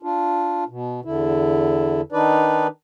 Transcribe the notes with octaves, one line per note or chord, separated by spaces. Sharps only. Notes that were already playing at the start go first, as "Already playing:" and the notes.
D4 F4
B2
E2 D3 E4
D#3 D4 D#4 B4 D5